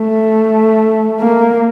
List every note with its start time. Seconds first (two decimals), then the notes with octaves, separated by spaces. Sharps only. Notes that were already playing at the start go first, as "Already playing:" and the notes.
Already playing: A3
1.20 A#3